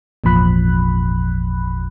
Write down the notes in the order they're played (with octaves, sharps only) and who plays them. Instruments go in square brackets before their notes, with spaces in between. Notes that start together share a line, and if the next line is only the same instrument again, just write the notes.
[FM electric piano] G#1 E2 A#2 F3 B5 F#6